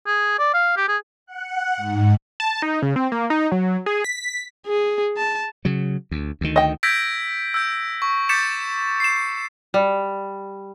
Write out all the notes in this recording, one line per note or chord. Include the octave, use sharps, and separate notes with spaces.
G#4
D5
F5
G4
G#4
F#5
G#2
A5
D#4
C#3
C4
A#3
D#4
F#3
G#4
B6
G#4
A5
C#3 F#3
D2
D2 D#3
D#5 G5
E6 G6 G#6 A#6 B6 D7
E6 G6
C#6
D6 G6 A6 B6 C#7 E7
C7 E7
G3